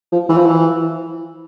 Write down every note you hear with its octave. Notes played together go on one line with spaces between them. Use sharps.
F3
E3
F3
E3